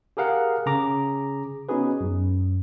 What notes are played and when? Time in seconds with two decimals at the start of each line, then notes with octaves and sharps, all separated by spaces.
0.17 G4 G#4 A#4 F5 F#5
0.66 C#3 G#4 A#5 D6
1.69 B3 C#4 D#4 F#4 G#4 B4
2.01 F#2